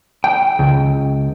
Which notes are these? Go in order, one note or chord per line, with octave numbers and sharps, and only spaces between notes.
G5
C#2